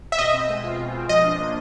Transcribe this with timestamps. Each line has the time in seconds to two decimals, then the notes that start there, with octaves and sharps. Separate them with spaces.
0.12 E5
0.18 B2 D#5
0.34 C4
0.49 G#3
0.64 F4
0.79 B2
0.94 C4
1.09 F3 D#5
1.24 D4
1.39 A#3